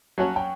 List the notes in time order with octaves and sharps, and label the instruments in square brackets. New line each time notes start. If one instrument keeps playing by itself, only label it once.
[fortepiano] F#3 C#4 F#4 C#5 [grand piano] A5
[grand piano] G5